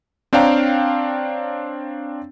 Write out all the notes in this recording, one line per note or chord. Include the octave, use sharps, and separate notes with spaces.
C4 D4 C#5 F5 G5 A#5